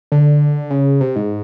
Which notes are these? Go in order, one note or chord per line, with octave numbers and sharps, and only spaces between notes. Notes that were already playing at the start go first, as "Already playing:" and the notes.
D3
C#3
C3
G#2